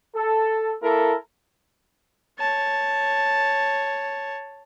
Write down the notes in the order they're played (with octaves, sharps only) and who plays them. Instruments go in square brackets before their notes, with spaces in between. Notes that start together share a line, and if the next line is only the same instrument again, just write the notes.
[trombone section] A4
A#3 E4 A4 A#4
[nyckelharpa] C#5 A5